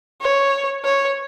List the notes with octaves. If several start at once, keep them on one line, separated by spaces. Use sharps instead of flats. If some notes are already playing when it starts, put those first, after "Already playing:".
C#5
C#5